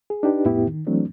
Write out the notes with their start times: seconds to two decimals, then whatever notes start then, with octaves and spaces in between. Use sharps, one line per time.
0.10 G#4
0.23 D4 D#4 G4 B4
0.45 F2 A2 B3 E4 G4
0.67 D#3
0.87 E3 F#3 A3 C4 D4